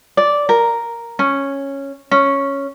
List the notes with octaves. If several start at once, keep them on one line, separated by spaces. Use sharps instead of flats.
D5
A#4
C#4
C#4